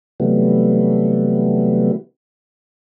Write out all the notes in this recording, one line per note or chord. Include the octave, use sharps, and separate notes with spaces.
C3 E3 F#3 G3 A3 B3